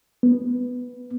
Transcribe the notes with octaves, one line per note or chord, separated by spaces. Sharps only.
B3